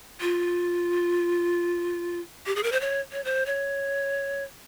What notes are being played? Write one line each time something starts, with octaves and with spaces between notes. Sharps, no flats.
F4
G4
G#4
A#4
C5
C#5
C#5
C5
C#5